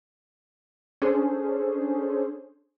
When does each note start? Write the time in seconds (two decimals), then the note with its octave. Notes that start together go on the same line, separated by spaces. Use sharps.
1.02 C#4 D4 G#4 A4 C5